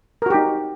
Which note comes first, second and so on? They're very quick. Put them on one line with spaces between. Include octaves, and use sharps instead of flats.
A#4 F#4 G4 D#4